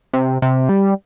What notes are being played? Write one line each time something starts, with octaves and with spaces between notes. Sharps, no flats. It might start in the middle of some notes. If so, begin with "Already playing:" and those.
C3
C3
G3